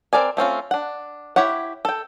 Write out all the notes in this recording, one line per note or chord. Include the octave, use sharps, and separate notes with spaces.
C4 D#4 A#4 D5 G#5
A3 C4 C#4 F4
D4 F#5
E4 G4 C#5 F#5
A4 G5